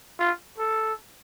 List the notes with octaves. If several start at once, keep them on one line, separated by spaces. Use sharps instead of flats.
F4
A4